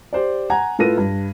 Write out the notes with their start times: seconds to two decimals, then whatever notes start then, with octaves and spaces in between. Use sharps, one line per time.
0.13 G4 C5 D5
0.50 F#5 G#5 A#5 G#6
0.79 A2 F4 A4 B4 A#6 D#7
0.98 G2